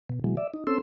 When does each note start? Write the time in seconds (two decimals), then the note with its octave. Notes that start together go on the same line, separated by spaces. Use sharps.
0.09 B2
0.24 B2 E3 F#3 G#3
0.37 D5 E5
0.54 D#4
0.67 C4 C#4 A4 C6 E6